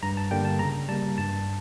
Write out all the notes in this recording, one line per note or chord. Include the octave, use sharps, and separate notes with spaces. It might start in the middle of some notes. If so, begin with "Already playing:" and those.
G2 A#5
A5
D3 G3 A#3 G5
A5
C#3 A#5
G3 A#3 A5
G2 A5